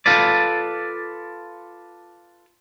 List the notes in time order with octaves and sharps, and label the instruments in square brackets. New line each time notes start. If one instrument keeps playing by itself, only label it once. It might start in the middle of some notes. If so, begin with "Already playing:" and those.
[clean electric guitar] F4 A4 B4 D5